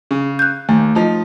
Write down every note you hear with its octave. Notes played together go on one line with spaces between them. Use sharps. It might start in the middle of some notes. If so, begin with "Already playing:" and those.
C#3
F#6 G6
D#2 A3
F3 D#4